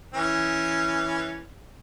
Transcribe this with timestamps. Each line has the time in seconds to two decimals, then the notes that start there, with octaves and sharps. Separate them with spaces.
0.14 E3 C#4